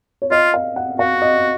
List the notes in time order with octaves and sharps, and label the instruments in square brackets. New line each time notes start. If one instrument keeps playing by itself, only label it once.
[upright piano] C#5
[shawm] F4 [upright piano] D#5
[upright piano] F5
F#5
[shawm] F#4 [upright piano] F5
[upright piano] D#5